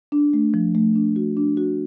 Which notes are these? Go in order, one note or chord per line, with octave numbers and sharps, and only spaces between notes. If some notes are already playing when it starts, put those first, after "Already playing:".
D4
A3
F3
A3
D4
F#4
D4
F#4